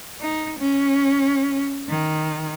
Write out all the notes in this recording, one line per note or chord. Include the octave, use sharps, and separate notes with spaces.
D#4
C#4
D#3